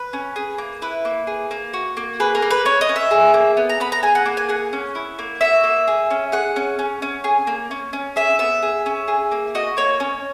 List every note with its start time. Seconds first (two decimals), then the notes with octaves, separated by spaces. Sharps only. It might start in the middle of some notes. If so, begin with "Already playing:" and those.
Already playing: B4
0.13 C#4
0.36 G#4
0.58 A#3
0.82 E4 B4
1.05 A#3
1.27 G#4
1.51 A#3
1.73 F#4
1.97 A#3
2.20 G#4 B4
2.35 A#4
2.42 A#3
2.50 B4
2.65 C#4 C#5
2.81 D#5
2.89 C#4
2.96 E5
3.11 G#4
3.34 A#3
3.57 B3
3.69 A#5
3.80 B3 B5
3.92 A#5
4.03 G#4 G#5
4.15 F#5
4.26 A#3
4.37 G#5
4.49 G#4 F#5
4.73 C#4
4.95 E4
5.19 A#3
5.41 F#4 E5
5.64 A#3
5.88 G#4
6.10 C#4
6.32 G#4 F#5
6.56 C#4
6.79 C#4
7.02 C#4
7.24 G#4
7.47 A#3
7.71 C#4
7.93 C#4
8.16 G#4 E5
8.39 B3 E5
8.62 G#4
8.86 C#4
9.08 G#4
9.32 A#3
9.55 F#4 D#5
9.77 A#3 C#5
10.00 C#4